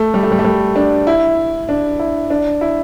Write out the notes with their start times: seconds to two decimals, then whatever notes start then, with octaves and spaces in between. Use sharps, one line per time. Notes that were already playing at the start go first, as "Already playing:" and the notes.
Already playing: A3
0.14 G3
0.23 A3
0.32 G3
0.39 A3
0.45 G3
0.76 D4
1.07 E4
1.69 D4
1.99 E4
2.30 D4
2.61 E4